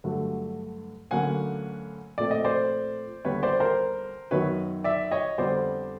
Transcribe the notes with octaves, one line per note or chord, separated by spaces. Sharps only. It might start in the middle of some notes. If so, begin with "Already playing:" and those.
G2 D3 F#3 A3
D2 D3 F#3 A#3 C#4 F#5 G#5
A#2 F3 A3 C4 D5
D#5
C5 D5
D#2 D3 G3 B3 B4 C#5
C5 D5
A#4 C5
F#2 D#3 F#3 B3 B4 C#5
D5 E5
C#5 D#5
F2 D3 G3 B3 C5 D5